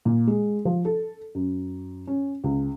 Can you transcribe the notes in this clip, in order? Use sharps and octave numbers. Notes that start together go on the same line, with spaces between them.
A#2
G#3
F3
A4
F#2
C#4
C#2